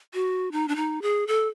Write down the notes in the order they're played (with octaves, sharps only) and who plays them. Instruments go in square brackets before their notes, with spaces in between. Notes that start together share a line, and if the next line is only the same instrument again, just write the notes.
[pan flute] F#4
D#4
D4
D#4
G#4
A4